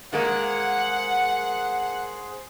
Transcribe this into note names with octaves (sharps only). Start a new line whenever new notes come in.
D#3 G#3 A#3 G#4 C5 F#5